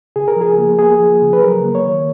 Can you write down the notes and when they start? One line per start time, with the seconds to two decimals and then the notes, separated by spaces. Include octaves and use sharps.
0.16 C#3 G#4
0.28 A#4
0.37 F3 G#4
0.58 A#3
0.79 A#3 G#4
1.00 F3
1.22 C#3
1.33 B4
1.43 F#3 A#4
1.64 A#3
1.75 C#5
1.85 D#3